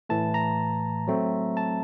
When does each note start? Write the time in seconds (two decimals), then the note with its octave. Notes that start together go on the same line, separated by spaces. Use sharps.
0.09 A2 E3 A3 A5
0.34 A#5
1.07 F#3 A3 C4
1.57 A5